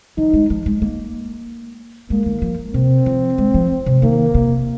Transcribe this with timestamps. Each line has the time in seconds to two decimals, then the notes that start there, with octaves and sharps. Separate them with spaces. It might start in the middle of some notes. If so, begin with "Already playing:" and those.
0.18 F3 D#4
0.34 G#3
0.50 F3
0.66 G#3
0.82 A#3
2.10 G#3 A#3
2.26 D#3
2.42 F3
2.74 C3 C4
3.06 F3
3.38 G#3
3.54 F3
3.86 C3
4.02 D#3 A#3
4.35 C3